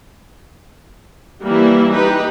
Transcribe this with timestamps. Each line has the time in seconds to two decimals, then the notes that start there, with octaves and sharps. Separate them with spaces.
1.42 E3 G3 A#3 E4
1.93 D#4 G4 B4